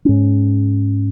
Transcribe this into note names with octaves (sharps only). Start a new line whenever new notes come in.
G#2 C#4